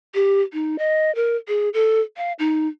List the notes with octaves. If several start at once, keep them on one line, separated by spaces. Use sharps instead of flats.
G4
D#4
D#5
A#4
G#4
A4
F5
D#4